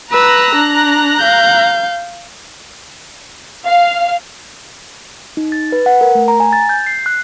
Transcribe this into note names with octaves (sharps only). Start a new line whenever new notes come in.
B4 A#5 E6 F#6 A#6
D4
F5 G6
F5
D#4
A6
B4
F#5
A#4
A3
A#5
G#5
A6
G6
C7
F#6